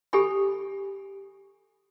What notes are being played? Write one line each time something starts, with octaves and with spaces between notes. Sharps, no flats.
G4 A4 G#5 B5